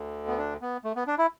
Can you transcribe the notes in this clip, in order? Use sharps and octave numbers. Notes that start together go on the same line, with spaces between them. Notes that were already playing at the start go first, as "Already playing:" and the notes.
Already playing: D2 D3
B3
D4
B3
A3
B3
D4
E4